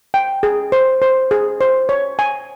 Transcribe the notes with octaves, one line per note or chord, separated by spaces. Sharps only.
G5
G#4
C5
C5
G#4
C5
C#5
G#5